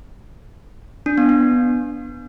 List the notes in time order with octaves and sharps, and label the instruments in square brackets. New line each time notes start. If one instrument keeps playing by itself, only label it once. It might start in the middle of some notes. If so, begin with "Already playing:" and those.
[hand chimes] D4
B3
B3